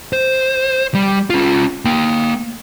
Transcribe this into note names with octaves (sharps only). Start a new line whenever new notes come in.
C5
G3
C#4 F4
A#3 G5